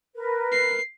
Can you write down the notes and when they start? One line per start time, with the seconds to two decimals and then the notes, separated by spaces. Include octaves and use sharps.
0.15 A#4 B4
0.52 C7